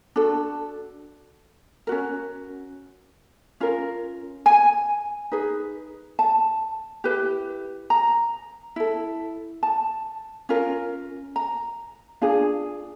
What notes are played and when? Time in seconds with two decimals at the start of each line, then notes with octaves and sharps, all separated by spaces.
0.16 D4 F#4 A4
1.87 C#4 F#4 A#4
3.60 C#4 F4 A#4
4.46 G#5
5.32 D#4 G#4 B4
6.19 A5
7.04 E4 G4 B4
7.90 A#5
8.76 E4 A4
9.63 A5
10.49 C#4 F4 A#4
11.36 A#5
12.22 D4 F4 G#4